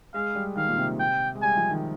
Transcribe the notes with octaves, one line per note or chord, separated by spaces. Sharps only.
G#3 F5
G3
D#3 F5
A#2
C3
G5
G#3
G3 G#5
F3
D#3